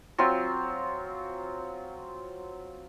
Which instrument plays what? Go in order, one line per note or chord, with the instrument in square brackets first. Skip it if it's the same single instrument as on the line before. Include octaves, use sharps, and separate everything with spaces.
[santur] F#3 C4 F4